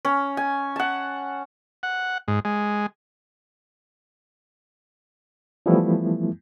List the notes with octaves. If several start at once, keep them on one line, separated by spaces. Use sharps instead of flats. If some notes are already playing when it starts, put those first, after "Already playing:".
C#4
G#5
F#5 A5
F#5
G#2
G#3
E3 F3 G3 A3 B3 E4